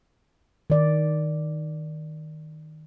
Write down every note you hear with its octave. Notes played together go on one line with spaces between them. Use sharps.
D#3 D5